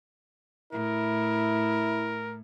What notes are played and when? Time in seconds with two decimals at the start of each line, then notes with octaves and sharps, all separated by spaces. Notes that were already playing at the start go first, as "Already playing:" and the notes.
0.72 A2 E4 A#4